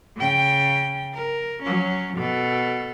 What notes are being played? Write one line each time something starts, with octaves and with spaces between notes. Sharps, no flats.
C#3 G5
A#4
F#3 C#4
B2 A4